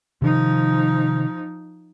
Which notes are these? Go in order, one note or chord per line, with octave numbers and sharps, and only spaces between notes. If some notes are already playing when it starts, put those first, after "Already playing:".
C3 D#3 F3 D#4